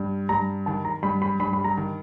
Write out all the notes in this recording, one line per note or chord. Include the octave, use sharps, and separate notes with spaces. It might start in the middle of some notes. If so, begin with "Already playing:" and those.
Already playing: G2
G2 A#5
D#3 A5
A#5
G2 B5
B5
G2 B5
B5
A#5
D#3